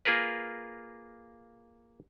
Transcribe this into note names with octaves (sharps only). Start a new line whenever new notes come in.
A#3 F4 G#4 A#4 B4